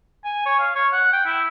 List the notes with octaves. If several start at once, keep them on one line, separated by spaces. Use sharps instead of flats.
G#5
C#5
F5
C#5
F#5
G5
E4